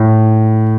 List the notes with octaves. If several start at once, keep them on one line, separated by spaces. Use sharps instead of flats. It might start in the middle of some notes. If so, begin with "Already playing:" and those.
Already playing: A2